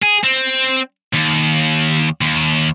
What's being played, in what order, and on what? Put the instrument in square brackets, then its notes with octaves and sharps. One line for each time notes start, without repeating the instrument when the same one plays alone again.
[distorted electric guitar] G#4
C4
D#2
D#2